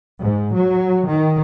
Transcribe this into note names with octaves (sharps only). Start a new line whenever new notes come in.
G#2
F#3
D#3